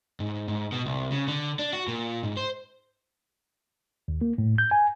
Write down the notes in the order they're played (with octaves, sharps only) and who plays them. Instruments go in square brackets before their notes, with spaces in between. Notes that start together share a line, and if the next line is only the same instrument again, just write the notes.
[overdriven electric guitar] G#2
G#2
B2
C2
C#3
D3
D4
F#4
A#2
G#2
C5
[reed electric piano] D#2
A#3
A2
G6
G#5